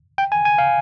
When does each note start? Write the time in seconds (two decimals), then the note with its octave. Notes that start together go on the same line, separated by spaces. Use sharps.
0.18 G5
0.32 G#5
0.45 G#5
0.58 F5